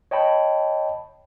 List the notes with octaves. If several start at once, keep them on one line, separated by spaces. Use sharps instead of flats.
C#5 D#5 G5 A5 B5